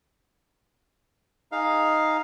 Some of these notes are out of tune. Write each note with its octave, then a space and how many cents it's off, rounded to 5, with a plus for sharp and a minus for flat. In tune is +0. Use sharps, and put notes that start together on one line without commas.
D#4 +0 G#4 +0 F5 +0